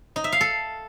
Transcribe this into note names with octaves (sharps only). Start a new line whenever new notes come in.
D#4
E5
F5
A4